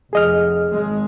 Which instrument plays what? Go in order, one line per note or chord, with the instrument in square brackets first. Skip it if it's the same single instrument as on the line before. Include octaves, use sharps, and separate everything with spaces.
[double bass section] F1 [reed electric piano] G#4 D#5 F6
[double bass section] G#1 G#3